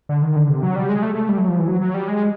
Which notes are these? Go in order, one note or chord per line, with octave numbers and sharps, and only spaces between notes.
D3
D#3
D3
C3
F#3
G3
G#3
A3
A3
G3
F#3
F3
E3
F#3
F#3
G3
G#3